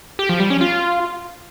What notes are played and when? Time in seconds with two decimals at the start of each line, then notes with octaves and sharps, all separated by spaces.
0.19 G4
0.29 F3
0.40 G3
0.50 C#4
0.61 F4